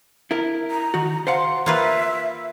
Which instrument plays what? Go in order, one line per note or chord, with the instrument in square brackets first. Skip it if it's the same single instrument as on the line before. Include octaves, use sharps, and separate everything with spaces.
[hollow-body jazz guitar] E4 A#4
[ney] A#5
[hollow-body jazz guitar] D#3 F#4
[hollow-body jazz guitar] C5 F5 F#5 [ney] C6
[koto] A#3 F4 B4 [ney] E5